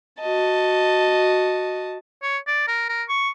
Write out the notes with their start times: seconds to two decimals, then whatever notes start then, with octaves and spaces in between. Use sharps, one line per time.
0.19 F#4 D#5 A5
2.23 C#5
2.47 D5
2.68 A#4
2.89 A#4
3.09 C#6